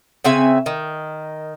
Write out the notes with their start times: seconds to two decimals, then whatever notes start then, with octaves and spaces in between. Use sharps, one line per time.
0.24 C#3 C4 E5 G#5
0.66 D#3